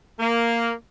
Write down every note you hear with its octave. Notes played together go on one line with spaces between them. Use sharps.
A#3